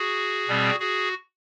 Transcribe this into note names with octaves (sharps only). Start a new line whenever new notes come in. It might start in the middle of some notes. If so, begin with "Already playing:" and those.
Already playing: F#4 G#4
B2 G3 C4
F#4 G#4